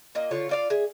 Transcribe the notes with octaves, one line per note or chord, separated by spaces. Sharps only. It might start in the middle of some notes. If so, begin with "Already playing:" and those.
A#2 A#3 D#5
D3 F4 C#5
F4 D5 F5
G#4 E5